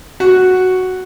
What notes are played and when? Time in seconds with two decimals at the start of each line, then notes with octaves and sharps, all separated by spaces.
0.20 F#4